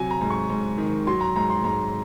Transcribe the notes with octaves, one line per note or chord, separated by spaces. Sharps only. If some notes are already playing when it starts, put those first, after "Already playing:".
Already playing: C3 F#3 G#5
A#5
G#2
C#6
G#2
D#3
F#3 C6
A#5
G#2 A#5
C6
G#2 A#5